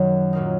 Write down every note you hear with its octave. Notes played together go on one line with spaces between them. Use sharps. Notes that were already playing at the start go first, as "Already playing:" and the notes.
Already playing: F#2 D#3 F#3
A#2 F#3 A#3 D#4